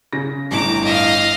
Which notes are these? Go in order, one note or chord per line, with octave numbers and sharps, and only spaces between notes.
C#3 A#6
G1 A2 A#5 D6 E7
D#5 F5